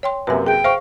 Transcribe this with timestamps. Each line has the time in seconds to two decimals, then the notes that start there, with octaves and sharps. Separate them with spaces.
0.03 C#5 G5 C6
0.27 F#2 C3 A#3 B4 G#5
0.47 G#4 G5 G6
0.64 C5 F5 C#6